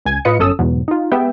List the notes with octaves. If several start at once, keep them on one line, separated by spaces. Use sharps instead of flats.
C#2 G#5 G#6
A2 F4 B4 D#5 C#7
G1 F#2 C#4 A4 D#6 E6
E2 G#2 B2 F#3
D#4 F4
G#3 B3 G4 E5 G5